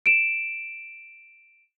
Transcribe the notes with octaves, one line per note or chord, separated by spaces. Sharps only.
D7 E7